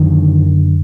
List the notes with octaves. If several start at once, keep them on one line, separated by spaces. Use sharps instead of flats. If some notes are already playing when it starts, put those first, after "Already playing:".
Already playing: F#2 D3 D#3